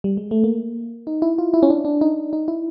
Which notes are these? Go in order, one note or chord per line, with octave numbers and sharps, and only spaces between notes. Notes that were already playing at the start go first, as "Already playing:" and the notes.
G3
G#3
A3
A#3
D#4
E4
F4
E4
C#4
D4
D4
D#4
D#4
E4